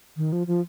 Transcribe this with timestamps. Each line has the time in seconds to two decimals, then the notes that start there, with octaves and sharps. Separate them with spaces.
0.17 D#3
0.32 F3
0.47 F3